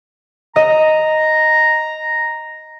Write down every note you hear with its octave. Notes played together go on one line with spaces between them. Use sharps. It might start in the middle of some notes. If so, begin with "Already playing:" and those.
D#5 A#5